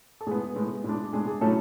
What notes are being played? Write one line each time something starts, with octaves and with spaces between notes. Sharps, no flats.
A4
A2 G#3 B3 G#4
A2 G#3 B3
A2 G#3 D4
A2 G#3 D4 G#4
G#4
A2 F#3 A3 C#4 E4 A4